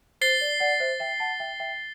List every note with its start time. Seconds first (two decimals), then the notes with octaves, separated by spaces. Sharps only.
0.21 C5 A6 C7 G7
0.41 D5
0.60 D5 F#5
0.80 C5 E5
1.00 E5 G5
1.20 F#5 A5
1.40 E5 G5
1.60 E5 G5